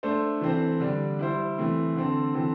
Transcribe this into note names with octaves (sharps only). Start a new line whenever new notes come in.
A3 D4 A4 C5
E3 C4 A4 C5
D3 G3 D4
G3 E4 C5
E3 A3 C4
D3 C4 A4
E3 C4 A4